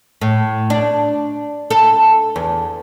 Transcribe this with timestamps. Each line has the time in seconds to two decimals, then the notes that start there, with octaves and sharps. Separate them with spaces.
0.21 A2
0.70 D4
1.70 A4
2.36 E2